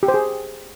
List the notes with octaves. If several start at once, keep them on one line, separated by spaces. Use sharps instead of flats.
G4
C5
G#4